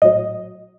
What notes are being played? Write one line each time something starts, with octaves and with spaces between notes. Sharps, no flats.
A#1 A2 F#3 D#5